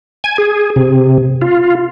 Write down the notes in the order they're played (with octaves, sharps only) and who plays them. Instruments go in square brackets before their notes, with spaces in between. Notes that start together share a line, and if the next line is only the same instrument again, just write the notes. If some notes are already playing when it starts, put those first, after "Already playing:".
[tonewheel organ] G#5
G#4
C3
F4